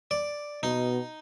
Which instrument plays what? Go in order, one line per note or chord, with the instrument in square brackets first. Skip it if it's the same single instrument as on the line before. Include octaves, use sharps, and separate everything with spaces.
[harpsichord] D5
[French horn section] B2 [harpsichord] D#4